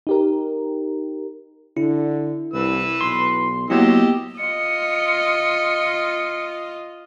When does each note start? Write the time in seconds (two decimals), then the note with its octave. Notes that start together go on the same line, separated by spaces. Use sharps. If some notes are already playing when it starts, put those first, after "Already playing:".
0.07 D#4 G4 A#4
1.77 D3 E4
2.53 C2 B4 E6
3.01 B1 C6
3.70 F#3 A#3 B3 E4 G4 D#5 E6
4.38 F4 D#5 C#7